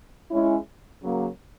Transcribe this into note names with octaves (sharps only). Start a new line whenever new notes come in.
G#3 C#4 E4
C#3 F#3 A#3